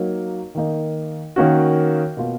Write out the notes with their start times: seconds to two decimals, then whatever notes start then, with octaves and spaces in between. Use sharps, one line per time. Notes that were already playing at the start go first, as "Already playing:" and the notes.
Already playing: F#3 A#3 D#4
0.55 D#3 A#3 D#4
1.36 D#3 A#3 C#4 F#4
2.17 B2 A#3 F4